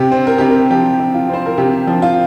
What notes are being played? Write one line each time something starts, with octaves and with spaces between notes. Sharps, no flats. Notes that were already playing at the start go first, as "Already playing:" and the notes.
Already playing: C3 G4
C4
A#4
C3 G4
A#4
F3 G4
C3
F4
C4 C5
A#4
C3 G4
F3
F4